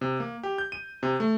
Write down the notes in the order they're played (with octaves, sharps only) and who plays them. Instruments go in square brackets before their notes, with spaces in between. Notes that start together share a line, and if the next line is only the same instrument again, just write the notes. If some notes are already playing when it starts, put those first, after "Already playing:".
[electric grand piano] C3
A#3
G4
G6
D#7
C3
A3